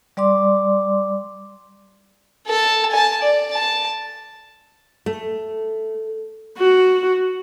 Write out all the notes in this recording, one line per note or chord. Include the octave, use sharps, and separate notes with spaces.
G3 D5 C6 D6
A4 A5
G#5 A5
D5
A5
A3
F#4